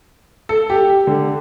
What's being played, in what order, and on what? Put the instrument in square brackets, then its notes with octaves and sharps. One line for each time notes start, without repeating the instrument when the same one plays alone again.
[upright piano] A4
G4
D3